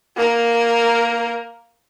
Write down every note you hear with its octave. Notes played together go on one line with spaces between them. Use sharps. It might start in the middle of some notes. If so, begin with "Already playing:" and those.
A#3 A#4